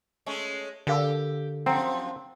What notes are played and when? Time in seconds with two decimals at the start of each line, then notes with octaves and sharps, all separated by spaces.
0.26 G#3 A3 C#4
0.87 D3 G4 A#4 F5 E6
1.66 F#2 F3 C4 F#5 G5 A#5